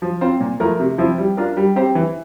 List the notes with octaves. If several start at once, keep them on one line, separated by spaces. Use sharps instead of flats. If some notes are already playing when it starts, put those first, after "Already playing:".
F3
C4 F4 C5
A#2
F3 A3 E4 A#4
C3
F3 C4 E4
G3
D4 F4 A#4
G3
C4 G4 C5
E3